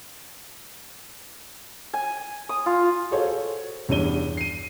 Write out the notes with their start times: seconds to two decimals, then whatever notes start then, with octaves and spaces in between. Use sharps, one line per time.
1.93 G#5
2.49 D#6
2.66 F4
3.11 F#4 G#4 A4 C5 C#5 F5
3.89 E2 G2 C#5 D#7 G7
4.37 C7 D#7